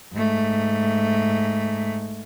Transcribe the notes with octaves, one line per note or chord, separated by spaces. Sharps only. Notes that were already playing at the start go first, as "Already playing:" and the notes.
G#2 A3